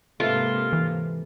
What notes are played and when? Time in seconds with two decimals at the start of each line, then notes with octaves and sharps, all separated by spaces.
0.20 G#2 C3 A#3 F4 A4 B4 E5
0.73 E3